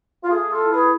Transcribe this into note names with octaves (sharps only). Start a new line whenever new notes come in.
F4
A3 G#4
F4 A4
E4
G#4 B4